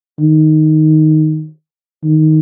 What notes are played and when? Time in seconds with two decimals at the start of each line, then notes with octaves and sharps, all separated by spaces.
0.19 D#3
2.04 D#3